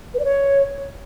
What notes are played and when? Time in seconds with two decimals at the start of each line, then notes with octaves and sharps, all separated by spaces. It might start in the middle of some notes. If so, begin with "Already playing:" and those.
0.14 B4
0.19 D5
0.24 C#5